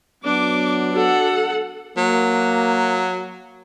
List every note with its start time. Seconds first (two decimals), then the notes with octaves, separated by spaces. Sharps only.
0.24 F#3 B3 D4 D6
0.93 F#4 A4 F#5
1.97 F#3 A#3